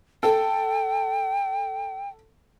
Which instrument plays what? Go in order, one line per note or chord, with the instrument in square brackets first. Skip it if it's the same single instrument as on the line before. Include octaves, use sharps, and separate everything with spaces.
[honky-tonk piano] A4 [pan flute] G5